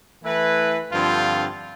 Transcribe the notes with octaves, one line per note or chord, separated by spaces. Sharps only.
E3 A3 E4 B4
G2 D3 F3 C4 F4